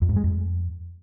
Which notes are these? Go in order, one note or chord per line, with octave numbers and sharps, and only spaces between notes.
F2
G#2
G#3
F2